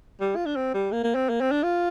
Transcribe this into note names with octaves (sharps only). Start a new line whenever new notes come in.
G3
F4
D4
C4
G3
A#3
A#3
C4
A#3
C4
D4
F4